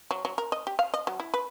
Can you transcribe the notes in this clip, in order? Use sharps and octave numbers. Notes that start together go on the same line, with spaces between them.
F#3
F#3
A#4
D#5
G4
F5
D#5
F#3
E4
B4